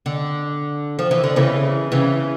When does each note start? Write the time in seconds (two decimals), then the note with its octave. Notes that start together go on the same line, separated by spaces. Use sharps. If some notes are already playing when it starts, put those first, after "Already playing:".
0.06 D3
0.99 F3
1.11 E3
1.24 D3
1.36 C#3 E3
1.92 C#3 E3